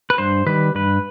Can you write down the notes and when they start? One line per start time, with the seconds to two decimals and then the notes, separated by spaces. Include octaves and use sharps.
0.10 B4
0.18 G2 C5
0.46 D#3 G3 B4
0.75 G2 B4